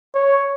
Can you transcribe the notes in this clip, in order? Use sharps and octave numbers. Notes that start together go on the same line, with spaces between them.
C#5